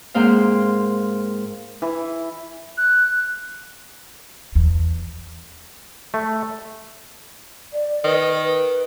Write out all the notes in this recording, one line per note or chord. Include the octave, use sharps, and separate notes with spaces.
G#2 A#3 C4 C5 F5
E3
F#6
E2
A3
D5
D#3 B4
B4